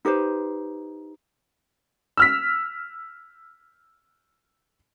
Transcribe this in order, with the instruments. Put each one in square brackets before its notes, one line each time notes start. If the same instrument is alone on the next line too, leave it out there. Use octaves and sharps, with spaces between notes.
[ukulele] D#4 G4 B4 C5
[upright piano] E6 F6 B6